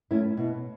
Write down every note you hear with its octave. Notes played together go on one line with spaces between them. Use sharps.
A3 C#4 E4
B2